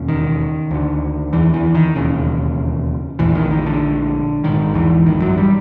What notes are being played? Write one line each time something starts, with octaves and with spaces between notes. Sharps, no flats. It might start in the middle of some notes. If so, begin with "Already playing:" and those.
Already playing: E1 D#2 C#3
D#3
D2 D3
E2 E3
E2 E3
D#3
E1 D#2 C#3
A#1 E2 A2 E3
D#3
D#3
D3
A#1 G#2 D#3
E2 E3
D#3
F#2 F#3
G3